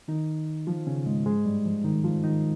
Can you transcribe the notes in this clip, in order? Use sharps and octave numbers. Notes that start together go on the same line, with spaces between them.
D#3 D#4
F3 F4
C#3 C#4
G#2 G#3
G#2 G#3
G2 G3
F3
D#3 D#4
F3 F4
D#3 D#4